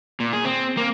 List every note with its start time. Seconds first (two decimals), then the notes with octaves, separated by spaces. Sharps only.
0.20 A#2
0.33 G#4
0.45 C4
0.77 A#3